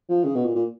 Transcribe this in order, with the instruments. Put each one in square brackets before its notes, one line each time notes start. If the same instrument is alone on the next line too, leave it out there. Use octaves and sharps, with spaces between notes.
[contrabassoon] F3
C#3
B2
A#2
A#2